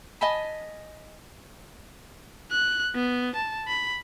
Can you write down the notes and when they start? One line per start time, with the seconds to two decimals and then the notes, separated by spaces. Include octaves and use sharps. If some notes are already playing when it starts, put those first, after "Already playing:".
0.21 D#5 G#5 A5 B5
2.51 F#6
2.95 B3
3.36 A5
3.68 B5